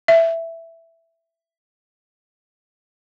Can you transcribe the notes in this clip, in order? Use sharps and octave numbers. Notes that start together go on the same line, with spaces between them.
E5